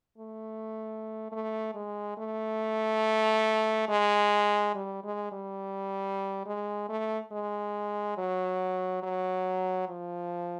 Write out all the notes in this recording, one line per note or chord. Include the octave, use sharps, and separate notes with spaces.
A3
A3
G#3
A3
G#3
G3
G#3
G3
G#3
A3
G#3
F#3
F#3
F3